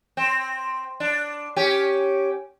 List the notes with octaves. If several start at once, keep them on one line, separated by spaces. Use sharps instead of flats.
C4
D4
C#4 G4